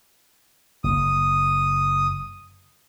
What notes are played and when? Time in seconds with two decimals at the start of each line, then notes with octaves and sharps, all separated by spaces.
0.84 F#1 D#6